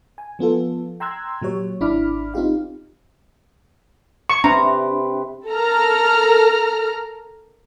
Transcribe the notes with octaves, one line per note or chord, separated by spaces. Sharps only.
G#5
F3 B3 F4 A4
G5 A#5 C6 E6 F#6 G#6
A#2 F#3 G4 C#5
G#1 D4 E4 B5 D6 F6
C4 D#4 F4 G4 F5
C#6
C3 D4 B4 A#5
A4 A#4 A#5 F6